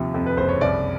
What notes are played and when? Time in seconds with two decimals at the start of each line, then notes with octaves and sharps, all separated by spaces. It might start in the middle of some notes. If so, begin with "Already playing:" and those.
Already playing: D#2 C3 F3
0.14 F2
0.26 B4
0.37 F#1 C5
0.49 C#5
0.61 C2 D5